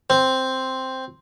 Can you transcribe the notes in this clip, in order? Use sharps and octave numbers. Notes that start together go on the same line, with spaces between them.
C4